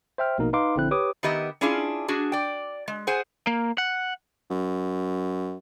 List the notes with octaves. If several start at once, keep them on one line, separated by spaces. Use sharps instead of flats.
C5 E5 G5 F6
A#1 B2 A#3 D#4 A#4
D#4 B4 F5 C6 D6
A#1 D3 C4 E4 F#6
G4 B4 C#5 D6 D#6
D#3 B3 G4 D#5 E5
C#4 D4 E4 F4 G#4
D4 F#4 G#4
D5 G5
G#3
G#4 C5 F#5 G#5
A#3
F#5
F#2